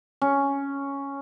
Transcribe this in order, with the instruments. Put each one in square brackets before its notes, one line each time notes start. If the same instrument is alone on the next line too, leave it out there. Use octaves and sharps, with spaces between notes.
[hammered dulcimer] C#4